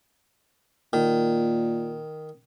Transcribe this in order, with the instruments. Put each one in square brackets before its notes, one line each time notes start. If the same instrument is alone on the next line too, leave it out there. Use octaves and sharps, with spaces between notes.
[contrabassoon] A#2 [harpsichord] D#3